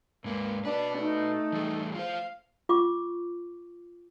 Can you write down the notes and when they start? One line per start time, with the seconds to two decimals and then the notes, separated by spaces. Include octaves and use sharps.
0.24 G#2 G#3 A#3 B4
0.65 D4 F#4 B4
1.00 A3 D#4
1.53 E3 G3 G#4
1.95 F4 C5 F5
2.69 F4 C#6 D6